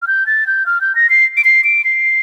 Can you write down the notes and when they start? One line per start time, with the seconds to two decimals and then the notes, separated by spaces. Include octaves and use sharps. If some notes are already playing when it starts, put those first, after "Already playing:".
0.02 F6
0.07 G6
0.26 A6
0.47 G6
0.66 F6
0.81 G6
0.95 A#6
1.10 C7
1.37 D7
1.44 C7
1.64 D7
1.84 C7